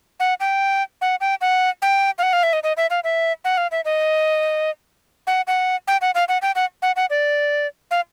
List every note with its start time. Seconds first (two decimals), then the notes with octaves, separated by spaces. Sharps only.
0.20 F#5
0.40 G5
1.01 F#5
1.21 G5
1.41 F#5
1.82 G5
2.18 F5
2.23 F#5
2.33 F5
2.43 E5
2.53 D#5
2.63 D#5
2.77 E5
2.90 F5
3.04 E5
3.45 F#5
3.57 F5
3.71 E5
3.85 D#5
5.27 F#5
5.47 F#5
5.88 G5
6.01 F#5
6.15 F5
6.29 F#5
6.42 G5
6.56 F#5
6.82 F#5
6.96 F#5
7.10 D5
7.91 F5